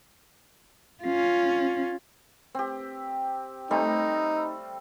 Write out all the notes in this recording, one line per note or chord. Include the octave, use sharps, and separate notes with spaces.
C#4 F4
C4 G4
G3 A3 C4 D#4